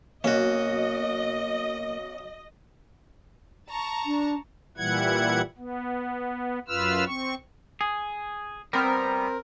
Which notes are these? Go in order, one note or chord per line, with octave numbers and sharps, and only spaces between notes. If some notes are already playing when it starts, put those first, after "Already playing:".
B1 A#3 C#4 F#4 D#5
A5 A#5 C#6
D4
A#2 E3 G3 E4 F#5 G#6
B3
F#2 F4 B4 E6 F6
C4 C#6
G#4
G3 B3 C4 A#4